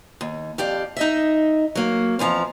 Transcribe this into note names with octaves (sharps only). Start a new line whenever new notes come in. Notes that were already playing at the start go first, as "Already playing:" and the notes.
D#2
F2 G4 D5 F5
D#4 D#5 E5
F#3 A#3
F2 E3 F3 A#5